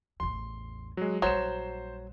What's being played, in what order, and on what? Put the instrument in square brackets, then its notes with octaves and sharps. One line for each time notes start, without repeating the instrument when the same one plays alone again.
[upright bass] A1 E2 [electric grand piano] C6
[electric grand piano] F#3 G#3
[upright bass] A#1 G3 [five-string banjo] F#3 [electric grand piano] C5 E7